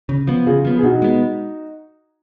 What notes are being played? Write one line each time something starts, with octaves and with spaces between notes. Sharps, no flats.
C#3
F3 B3
C#3 F4 G#4
F3 B3
G#4
B2 D#4 F#4
G#3 B3